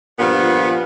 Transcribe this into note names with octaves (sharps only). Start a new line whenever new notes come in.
G2 A#2 F3 B3